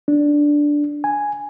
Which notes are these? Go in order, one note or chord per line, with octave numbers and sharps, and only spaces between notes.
D4
G#5